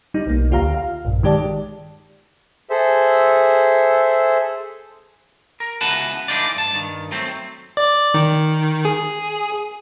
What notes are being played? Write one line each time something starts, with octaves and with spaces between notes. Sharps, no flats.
G3 D#4
B1 A#3
D2 F4 G4 F5 A#5
F5
A#1 G2
D#3 G#3 G4 D5 A5
G#4 A4 C5 E5
A#4
C#2 E3 B3 F#4 B4 A5
E3 A3 D4 D#4 F4 D5
G2 A5
G2 D#3
F#3 A3 C4
D5
D#3
G#4